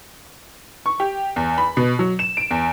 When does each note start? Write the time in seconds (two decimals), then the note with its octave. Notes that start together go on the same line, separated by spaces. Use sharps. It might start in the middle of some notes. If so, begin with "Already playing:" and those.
0.86 C#6
1.00 G4
1.36 E2
1.58 B5
1.77 B2
1.99 F#3
2.19 E7
2.37 D7
2.51 E2